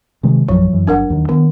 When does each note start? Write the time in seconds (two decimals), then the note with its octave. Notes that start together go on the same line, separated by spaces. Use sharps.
0.23 C3 D#3 G#3
0.48 A#1 F#2 F3 F#3
0.73 F#2 E3
0.87 G1 D4 A#4 F#5
1.10 D#2 D#3
1.29 D#3 B3